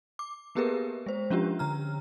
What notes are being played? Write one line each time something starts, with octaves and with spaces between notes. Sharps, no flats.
D6
A#3 B3 G4 G#4 A#4 B4
G#3 C5
F3 C#4 D4 F4 G4
D3 A#5 F6